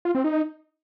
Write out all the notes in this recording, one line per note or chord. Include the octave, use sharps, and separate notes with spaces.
F4
C4
D#4